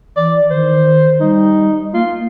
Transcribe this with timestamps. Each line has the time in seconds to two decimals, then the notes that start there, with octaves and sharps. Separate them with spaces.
0.17 E3 D5
0.50 D#3 C5
1.20 G3 D#4
1.94 A#3 F4